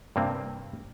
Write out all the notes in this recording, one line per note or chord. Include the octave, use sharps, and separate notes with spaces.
G2 C3 A#3 C4